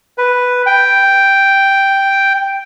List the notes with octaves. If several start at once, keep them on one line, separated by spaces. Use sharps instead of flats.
B4
G5